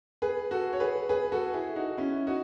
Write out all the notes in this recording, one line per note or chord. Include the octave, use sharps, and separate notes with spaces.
G#4 B4
F#4 A4
C#5
G#4 B4
G#4 B4
F#4 A4
E4 G#4
D#4 F#4
C#4 E4
D#4 F#4